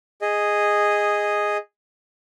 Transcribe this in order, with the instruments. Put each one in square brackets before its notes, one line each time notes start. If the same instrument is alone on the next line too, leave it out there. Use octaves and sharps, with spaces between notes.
[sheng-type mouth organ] G#4 D#5